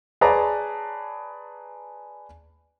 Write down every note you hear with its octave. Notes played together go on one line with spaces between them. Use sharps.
G#4 B4 C#5 D5 A5 A#5